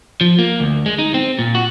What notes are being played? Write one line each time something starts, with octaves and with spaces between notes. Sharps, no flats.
F3
A#3
D2
G#3
D#4
C4
A#2
F#4